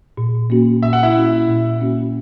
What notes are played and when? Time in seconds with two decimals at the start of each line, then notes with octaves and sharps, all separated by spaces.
0.17 A#2
0.50 A#3 C#4 F#4
0.83 A#2 E5
0.93 F#5
1.03 E4 E5
1.15 A#3 C#4 F#4
1.48 A#2
1.79 A#3 C#4 F#4